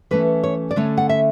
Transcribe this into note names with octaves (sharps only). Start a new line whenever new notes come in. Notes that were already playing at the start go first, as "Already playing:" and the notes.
E3 A3 C#4 B4
C#5
D5
D3 A3 C#4 C#5
F#5
E5